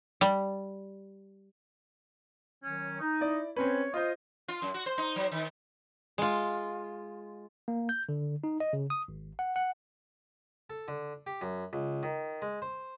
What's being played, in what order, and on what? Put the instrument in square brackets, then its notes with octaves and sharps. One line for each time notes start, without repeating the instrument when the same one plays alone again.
[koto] G3
[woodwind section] D#3 F#3 C#4
D#4
[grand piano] E4 D5
[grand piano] C4 C#4 B4 [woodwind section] C#5
[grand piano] F4 C5 [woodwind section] D#5
[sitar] F4
F#2
F#4
C5
D#4
F#3
D#3
[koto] G#3 F4
[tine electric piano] A#3
G6
D3
D#4
D#5
C#3
D#6
G#1
F#5
F#5
[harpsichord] A4
D3
G4
F#2
C#2
D#3
G#3
C5